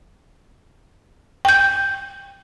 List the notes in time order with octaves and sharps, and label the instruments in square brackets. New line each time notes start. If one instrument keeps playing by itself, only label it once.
[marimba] G5 G6